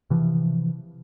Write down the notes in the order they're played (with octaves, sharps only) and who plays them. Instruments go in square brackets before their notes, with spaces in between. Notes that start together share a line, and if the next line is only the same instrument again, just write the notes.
[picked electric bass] C3 E3 F3